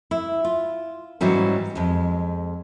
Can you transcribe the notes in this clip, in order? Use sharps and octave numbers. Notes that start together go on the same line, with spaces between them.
E4
F4
G#2 E3 F#3 G3 B3 C#4
F2 G#3